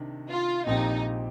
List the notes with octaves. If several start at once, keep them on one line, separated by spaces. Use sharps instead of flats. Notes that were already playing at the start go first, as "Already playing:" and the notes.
Already playing: C3 D#3 D4
F4
A#1 A#2 F3 C4 D#4 G4